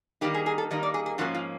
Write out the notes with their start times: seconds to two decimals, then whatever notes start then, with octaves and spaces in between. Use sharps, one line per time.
0.21 D#3 G3 A#3 D#4 G4
0.34 G#4
0.46 G#4
0.58 A4
0.71 D#3 G3 A#3 D#4 D#5
0.83 D5
0.94 G#4
1.06 G#4
1.18 G#2 F3 A#3 C#4 F#4
1.35 F4